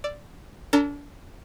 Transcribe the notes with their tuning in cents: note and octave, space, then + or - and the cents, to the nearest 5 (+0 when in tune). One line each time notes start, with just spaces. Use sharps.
D5 +0 E6 +20
D4 -35 A4 +40 A#5 +0